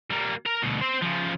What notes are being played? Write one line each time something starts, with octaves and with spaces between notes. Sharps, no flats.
G3 A#3
A#4 A#5
D2 B2
C4 C5
C#3 F3